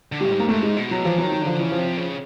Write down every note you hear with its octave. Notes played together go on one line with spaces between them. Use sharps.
D3
G3
G#2
A#3
G#2 A3
G#3
B2
F#3
E3 F3
F#3
D#3
F#3
D3 F3
C#3 E3
F3
C3
C#3